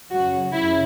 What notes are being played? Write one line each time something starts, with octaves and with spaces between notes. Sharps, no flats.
F#2 C#3 F#3 F#4
F#2 C#3 E3 E4